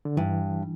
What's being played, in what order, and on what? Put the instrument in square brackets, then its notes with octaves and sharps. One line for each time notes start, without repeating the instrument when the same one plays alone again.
[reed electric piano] D3
[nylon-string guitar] G2 [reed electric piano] E3